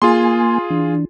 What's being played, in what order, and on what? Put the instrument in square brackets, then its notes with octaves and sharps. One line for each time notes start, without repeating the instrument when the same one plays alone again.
[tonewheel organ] A#3 G#5 [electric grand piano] F4 G#4 C6
[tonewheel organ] E3 D4